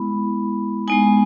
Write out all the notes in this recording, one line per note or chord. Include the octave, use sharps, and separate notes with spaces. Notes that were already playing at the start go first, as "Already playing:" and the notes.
Already playing: G#3 B3 E4 B5
G#3 B3 D#4 G#5